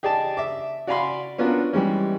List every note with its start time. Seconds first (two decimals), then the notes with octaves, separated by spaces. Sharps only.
0.03 G4 G#4 D5 D#5 A5
0.37 E5 D6
0.87 F#4 D5 F5 G#5 B5 C6
1.38 B3 C#4 D4 F4 F#4 A#4
1.73 E3 G3 G#3 C#4